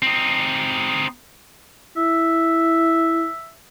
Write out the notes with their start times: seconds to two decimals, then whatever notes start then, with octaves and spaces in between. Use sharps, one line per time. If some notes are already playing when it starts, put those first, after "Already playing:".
0.03 C4 D#4
1.97 E4 E5